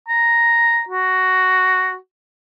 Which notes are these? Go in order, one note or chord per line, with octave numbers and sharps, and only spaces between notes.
A#5
F#4